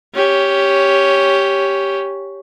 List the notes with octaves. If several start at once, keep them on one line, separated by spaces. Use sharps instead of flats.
C#4 G4